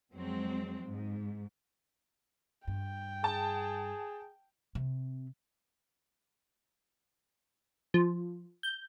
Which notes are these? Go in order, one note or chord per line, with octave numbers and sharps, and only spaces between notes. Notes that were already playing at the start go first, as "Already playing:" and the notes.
F2 F#3 G#3 C4
G#2
G2 G5
G#4 A5
C3
F3
G6